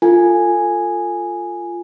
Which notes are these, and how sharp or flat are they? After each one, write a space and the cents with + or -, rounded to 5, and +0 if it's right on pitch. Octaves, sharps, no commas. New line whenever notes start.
F4 +0 A4 +30 G#5 +0